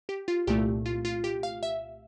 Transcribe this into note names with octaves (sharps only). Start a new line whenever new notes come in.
G4
F4
C2 A#2 A3 G4
F4
F4
G4
F5
E5